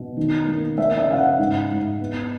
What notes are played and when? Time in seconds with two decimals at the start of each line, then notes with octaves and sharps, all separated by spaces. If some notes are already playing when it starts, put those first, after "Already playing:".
Already playing: B2
0.17 D#3
0.48 A#3
0.78 A#3 E5
0.98 E5
1.08 C#3 F5
1.18 F#5
1.38 G#2
1.70 G#2
2.00 B3